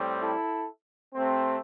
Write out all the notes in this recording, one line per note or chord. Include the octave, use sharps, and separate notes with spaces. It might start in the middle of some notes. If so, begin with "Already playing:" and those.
Already playing: A2 G3 C4
E4 A4
C3 A3 C4